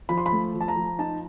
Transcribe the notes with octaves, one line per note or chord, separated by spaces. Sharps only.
F3 B5
C6
B5
A3
F3
A5
A#5
F3
D#4 A5